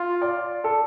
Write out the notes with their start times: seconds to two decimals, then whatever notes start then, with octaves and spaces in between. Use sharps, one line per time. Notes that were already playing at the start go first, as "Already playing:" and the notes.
Already playing: F4
0.22 D5
0.64 A4